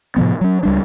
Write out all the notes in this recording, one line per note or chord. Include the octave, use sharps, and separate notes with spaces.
A2 C3 F3 B3
F#3 C#4
C#2 G3 D4